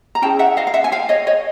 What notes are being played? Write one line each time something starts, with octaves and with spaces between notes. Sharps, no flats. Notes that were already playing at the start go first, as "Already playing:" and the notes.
A#5
C#4 E4 G#4 G5 A5
E5 F#5
D#5 F5
F5
E5 F#5
G#5
F5 G5
C#5 D#5
C#5 D#5